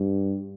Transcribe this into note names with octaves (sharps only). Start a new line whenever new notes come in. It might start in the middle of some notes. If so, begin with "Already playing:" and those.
Already playing: G2